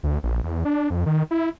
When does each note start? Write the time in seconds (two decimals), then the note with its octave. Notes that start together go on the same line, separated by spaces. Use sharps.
0.03 D2
0.23 A#1
0.43 E2
0.65 D4
0.90 F2
1.06 D#3
1.31 E4